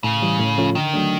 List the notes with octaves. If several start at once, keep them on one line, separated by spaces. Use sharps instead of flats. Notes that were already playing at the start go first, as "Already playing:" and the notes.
A2 C#3
E3 G3
A2
F3 A3 C#4 F4
D3 D#3
F#3 A3 D4